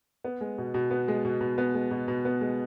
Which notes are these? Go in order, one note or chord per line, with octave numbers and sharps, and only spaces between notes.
B3
G#3
B2
B2
B3
G#3
B2
B2
B3
G#3
B2
B2
B3
G#3